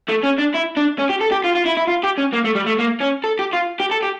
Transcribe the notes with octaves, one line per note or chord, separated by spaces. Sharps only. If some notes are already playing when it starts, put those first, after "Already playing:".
A3
C#4
D4
E4
D4
C#4
G4
A4
G4
F4
F4
E4
E4
F4
G4
C#4
A#3
A3
G3
A3
A#3
C#4
A4
G4
F4
G4
A4
G4